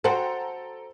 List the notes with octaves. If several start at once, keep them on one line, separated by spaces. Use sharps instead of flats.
F#4 A4 C5 G5 A#5